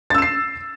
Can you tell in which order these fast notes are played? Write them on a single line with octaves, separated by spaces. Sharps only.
A6 E6 E7 C7